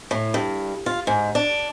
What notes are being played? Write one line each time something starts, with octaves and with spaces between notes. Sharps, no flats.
A2
G2
F4
G#2
D4